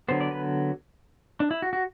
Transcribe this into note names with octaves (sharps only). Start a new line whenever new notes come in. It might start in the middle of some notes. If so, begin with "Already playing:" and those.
D3 F#3 B3 C5
D5
B4
D4
E4
F#4
F#4